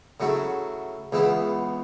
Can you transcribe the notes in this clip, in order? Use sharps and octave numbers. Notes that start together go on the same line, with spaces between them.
C#3 F#3 A3 E4
C#2 C#3 E3 B3 E4